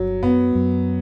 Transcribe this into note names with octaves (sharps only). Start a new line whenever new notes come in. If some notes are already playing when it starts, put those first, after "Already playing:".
Already playing: G1 F#3
F#2 B3
F#2